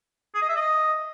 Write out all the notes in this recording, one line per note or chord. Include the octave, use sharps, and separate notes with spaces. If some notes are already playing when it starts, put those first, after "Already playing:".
G#4
D#5
E5
D#5